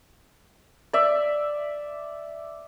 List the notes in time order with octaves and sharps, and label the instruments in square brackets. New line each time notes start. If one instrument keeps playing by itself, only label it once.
[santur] D5 E5